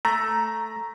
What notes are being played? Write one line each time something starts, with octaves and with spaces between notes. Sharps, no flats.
A3 A#5